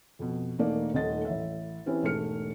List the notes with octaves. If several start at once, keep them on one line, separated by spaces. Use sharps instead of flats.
F2 B2
E1 A3 A#3 D#4 A4 D5
D#1 D#2 A3 D#5 A6
A1 E5
E3 C4 C#4 E4 G4 B4
E1 G#2 A3 G4 F6 C#7